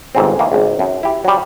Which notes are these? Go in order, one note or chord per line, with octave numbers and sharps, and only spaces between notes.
G1 G#2 C4
D#3 E3 A#3
G#1 C#2
F#2
E4 G4
F#3 G3